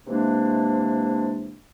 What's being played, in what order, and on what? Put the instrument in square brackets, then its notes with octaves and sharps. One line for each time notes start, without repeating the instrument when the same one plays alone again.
[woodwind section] C3 E3 G#3 A#3 D4